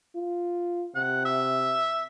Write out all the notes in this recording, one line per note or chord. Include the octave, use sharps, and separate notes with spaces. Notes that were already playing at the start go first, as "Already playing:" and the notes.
F4
C3 F#5
E5